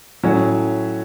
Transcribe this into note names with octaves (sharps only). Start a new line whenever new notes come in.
A2 F#3 C#4